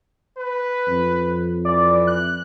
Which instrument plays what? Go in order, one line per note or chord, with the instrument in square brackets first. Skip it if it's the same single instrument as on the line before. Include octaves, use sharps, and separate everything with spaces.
[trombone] B4
[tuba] F2
[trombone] E3 [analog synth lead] D5
[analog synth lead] F#6